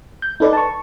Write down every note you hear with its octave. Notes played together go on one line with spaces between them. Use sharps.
G6
D#4 A4 B4 D5
A5 C#6